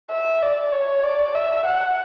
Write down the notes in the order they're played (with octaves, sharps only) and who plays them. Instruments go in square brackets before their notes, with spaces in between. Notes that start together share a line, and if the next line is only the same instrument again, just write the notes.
[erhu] E5
D5
C#5
D5
E5
F#5